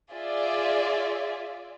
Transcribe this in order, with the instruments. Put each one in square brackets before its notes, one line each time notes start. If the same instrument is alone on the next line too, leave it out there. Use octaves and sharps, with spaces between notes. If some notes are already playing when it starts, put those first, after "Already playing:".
[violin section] F4 G#4 D5 E5